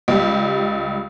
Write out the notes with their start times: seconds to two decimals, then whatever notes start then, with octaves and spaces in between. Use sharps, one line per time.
0.08 C#2 G3